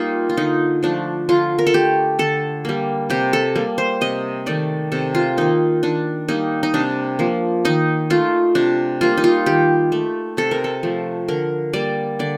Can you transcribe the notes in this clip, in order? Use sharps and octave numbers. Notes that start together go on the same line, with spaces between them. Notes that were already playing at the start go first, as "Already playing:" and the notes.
Already playing: G3 A#3 D#4 F4
F4
D3 D#4
F3 A3 D4
D3 F4
A#4
A4
A3 G4
D3 A4
G3 A#3
C3 G4
A4
G3 A#3
C5
C3 D#5
D#3 A3 D5
C3 A4
F4
D#3 A#3 D#4
D#3 D4
G3 A#3 D#4
D#4
C3 D4
F3 A#3
D#3 D#4
A3 F4
C3 D4
G3 A#3 F4
D#4
F4
D#3 G4
A3
C3 A4
A#4
A4
F3 A3
D3 A#4
G3 A#3 D5
D3 D5